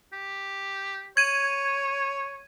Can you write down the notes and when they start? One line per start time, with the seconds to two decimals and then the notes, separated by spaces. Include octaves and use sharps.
0.13 G4
1.17 C#5 G#6 D#7